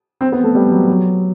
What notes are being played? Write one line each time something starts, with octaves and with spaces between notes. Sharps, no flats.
C4
B3
A3
G3
F#3
F#3